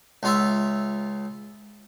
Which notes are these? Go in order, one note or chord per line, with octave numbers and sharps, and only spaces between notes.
C#2 F4 E5